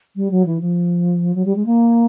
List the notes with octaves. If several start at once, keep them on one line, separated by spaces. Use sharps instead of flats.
G3
F#3
E3
F3
F#3
G3
G#3
A#3